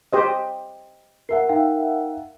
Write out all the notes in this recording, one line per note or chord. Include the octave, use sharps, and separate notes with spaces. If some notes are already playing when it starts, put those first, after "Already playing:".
G4 C5 D#5
A#4 E5 F#5 C7
D#4 F5 G5